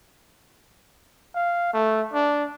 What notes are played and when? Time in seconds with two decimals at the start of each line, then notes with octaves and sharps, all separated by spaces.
1.35 F5
1.73 A3
2.13 D4